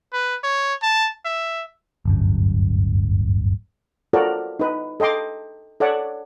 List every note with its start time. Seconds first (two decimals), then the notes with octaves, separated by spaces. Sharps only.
0.13 B4
0.44 C#5
0.83 A5
1.26 E5
2.05 D1 G1 F#2
4.13 F4 F#4 A4 A#4 C5 D5
4.59 D#4 B4
5.00 A4 D#5 G5 C6 D6
5.80 A4 C#5 D5 E5 F#5